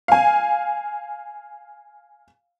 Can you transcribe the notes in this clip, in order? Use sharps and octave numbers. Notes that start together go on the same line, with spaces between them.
F5 G#5